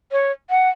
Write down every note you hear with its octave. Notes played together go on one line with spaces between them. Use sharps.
C#5
F#5